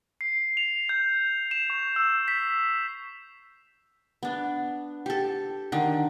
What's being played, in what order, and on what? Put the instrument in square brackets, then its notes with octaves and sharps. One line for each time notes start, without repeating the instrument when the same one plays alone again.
[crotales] C7
F7
G6
E7
C#6
E6
B6
[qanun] B3 D4
G4 A4
D3 D#3